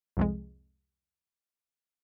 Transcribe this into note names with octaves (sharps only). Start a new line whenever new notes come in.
C2 F2 G#3